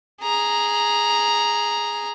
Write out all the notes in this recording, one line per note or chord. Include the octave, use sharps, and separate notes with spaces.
G#4 A#5